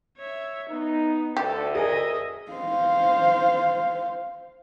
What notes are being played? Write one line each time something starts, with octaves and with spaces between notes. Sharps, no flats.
C#5 E5
B3 D#4
D2 G4 A4
G#4 A#4 D#5 E5 G#5
C5 F5